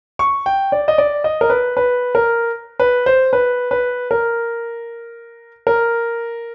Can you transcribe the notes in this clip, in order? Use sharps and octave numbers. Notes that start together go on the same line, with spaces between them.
C#6
G5
D5
D#5
D5
D#5
A#4
B4
B4
A#4
B4
C5
B4
B4
A#4
A#4